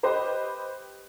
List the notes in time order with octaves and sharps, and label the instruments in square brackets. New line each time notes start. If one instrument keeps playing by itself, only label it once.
[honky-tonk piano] G4 B4 C5 D#5